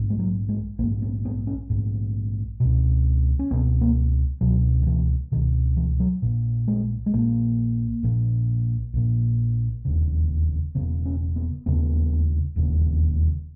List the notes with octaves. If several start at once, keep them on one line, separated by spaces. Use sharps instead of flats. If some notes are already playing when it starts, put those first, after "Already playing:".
Already playing: A#1 G#2
G#3
F#3
G#3
A#1 G#2 A#3
B3
B3
C#4
A#1 G#2
C#2 B2
C#4
C#2 B2 B3
A#3
C#2 B2 F#3
D#3
E3
C#2 B2 D#3
E3
F#3
A#1 A#2
G#3
G#3
A#1 A#2 A#3
A#1 A#2
A#1 A#2
E1 D#2 C#3
E1 D#2 C#3 B3
C#4
B3
E1 D#2 C#3 B3
E1 D#2 C#3